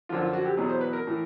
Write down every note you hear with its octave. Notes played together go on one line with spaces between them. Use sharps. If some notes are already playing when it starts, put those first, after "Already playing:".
F#2 D3 F3 F4
F4
F#4
G4
E2 B2 F#3 G#4
C5
B4
A#4
A2 E3